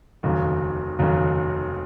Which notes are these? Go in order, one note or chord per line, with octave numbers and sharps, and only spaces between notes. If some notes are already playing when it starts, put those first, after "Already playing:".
F1 D#2 C#3 F#3
F1 D#2 C#3 F#3